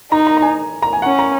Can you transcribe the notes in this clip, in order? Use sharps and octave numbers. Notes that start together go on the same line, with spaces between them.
D#4 A#5
A#5
A#5
G#5
A#5
G#5
C#4 F#5
A#5